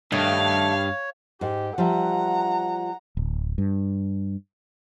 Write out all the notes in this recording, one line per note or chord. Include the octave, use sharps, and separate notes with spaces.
G2 D#3 A3 C#5 F5
G#2 G4
F3 G3 E5 F#5 A#5
D1
G2